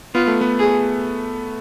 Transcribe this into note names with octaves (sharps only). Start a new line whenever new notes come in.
B3 F4
A3
B3
G#4